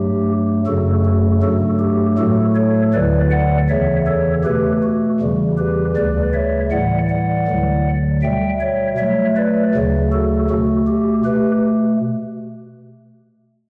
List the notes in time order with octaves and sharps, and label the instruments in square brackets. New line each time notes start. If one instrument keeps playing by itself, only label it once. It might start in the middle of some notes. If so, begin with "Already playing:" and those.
Already playing: [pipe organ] G2 F#3 A3 G4
F#2 C#3 F#3 A3 F#4 A4
F#4
G2 F#3 A3 F#4 A4
G4
A2 F#3 A3 F#4 A4
A4 C#5
D2 D3 F#3 B4 D5
D5 F#5
E2 C#3 E3 C#5 E5
A4 C#5
B2 A3 G4 B4
F#4
E2 C#3 E3 G3
G4 B4
D2 C#3 G3 B4 D5
C#5 E5
A2 E3 G3 D5 F#5
D5 F#5
D2 D3 F#3
B2 G3 E5 G5
C#5 E5
B2 F#3 A3 C#5 E5
B4 D5
D2 C#3 F#3 A3
F#4 A4
B2 A3 F#4
G4
B2 A3 G4 B4